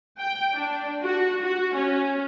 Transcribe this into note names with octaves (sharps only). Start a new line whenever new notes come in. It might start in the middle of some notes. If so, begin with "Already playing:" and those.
G5
D4
F#4
F#4
C#4